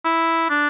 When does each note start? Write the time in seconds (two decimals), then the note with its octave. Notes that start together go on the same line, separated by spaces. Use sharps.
0.05 E4
0.50 D4